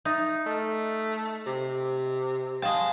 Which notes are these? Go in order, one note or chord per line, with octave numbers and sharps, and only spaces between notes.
D#4 E5 A6
A3 D#5 F6
C3
G#3 F5 G5 A5